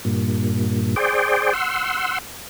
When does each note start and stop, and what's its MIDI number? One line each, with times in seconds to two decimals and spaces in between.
0.05 0.95 43
0.05 0.95 46
0.96 1.53 68
0.96 1.53 72
0.96 1.53 74
0.96 1.53 79
1.53 2.19 78
1.53 2.19 84
1.53 2.19 88